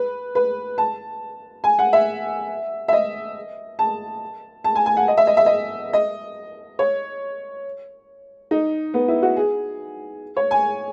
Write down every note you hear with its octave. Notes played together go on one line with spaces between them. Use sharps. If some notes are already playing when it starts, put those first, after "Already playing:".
Already playing: B4
B4
A5
G#5
F#5
E5
E5
D#5
A5
A5
G#5
G#5
F#5
D#5
E5
D#5
E5
D#5
D#5
C#5
D#4
B3
E4
F#4
G#4
C#5
G#5